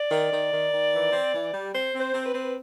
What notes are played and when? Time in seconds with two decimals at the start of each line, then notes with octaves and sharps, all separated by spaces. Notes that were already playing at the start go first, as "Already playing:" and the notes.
Already playing: D5
0.11 D#3
0.31 D#3
0.52 D#3
0.72 D#3
0.93 E3
1.12 C4
1.33 E3
1.52 G3
1.73 C4 C5
1.93 C4
2.00 C5
2.13 C4
2.26 B4
2.33 C4